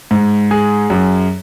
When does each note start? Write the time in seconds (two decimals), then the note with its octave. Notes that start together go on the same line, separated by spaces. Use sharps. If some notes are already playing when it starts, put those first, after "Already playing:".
0.11 G#2
0.51 G#4
0.90 F#2